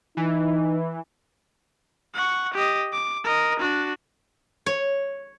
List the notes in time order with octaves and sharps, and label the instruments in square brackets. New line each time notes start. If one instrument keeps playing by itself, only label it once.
[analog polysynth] E3 [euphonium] D#4
[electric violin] F#5 C#6
G4 D#5
D6
A#4 D#5
D4 F#4
[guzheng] C#5